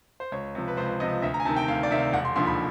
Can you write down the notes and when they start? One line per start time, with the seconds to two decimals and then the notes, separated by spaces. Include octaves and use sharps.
0.20 C5
0.32 C#2 C#5
0.55 C3 F3
0.68 B4
0.77 C#2 C5
1.00 C3 D#5
1.03 F3
1.22 D2 E5
1.34 A#5
1.40 G#5
1.45 C3 A5
1.49 D#3
1.56 G5
1.68 D2 F5
1.83 D5
1.91 C3 D#3 E5
1.98 F5
2.13 E1 F#5
2.25 C6
2.36 D#2 D3 F3 C6
2.47 B5